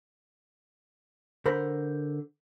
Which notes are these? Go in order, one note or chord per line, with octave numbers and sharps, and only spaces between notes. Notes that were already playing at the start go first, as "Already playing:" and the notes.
D3 A#4 C5 B5